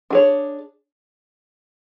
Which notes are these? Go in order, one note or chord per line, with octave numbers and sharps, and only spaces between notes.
D4 G#4 C#5